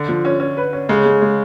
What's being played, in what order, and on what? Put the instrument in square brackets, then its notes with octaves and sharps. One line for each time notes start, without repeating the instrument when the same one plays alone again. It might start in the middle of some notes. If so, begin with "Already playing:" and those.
Already playing: [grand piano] D3
[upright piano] F3
C#4
C#4
B4
C#4
[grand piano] C#3 [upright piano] G#3
[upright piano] G#3
G#3